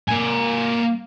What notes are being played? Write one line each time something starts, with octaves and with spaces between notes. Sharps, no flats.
A#3 G#5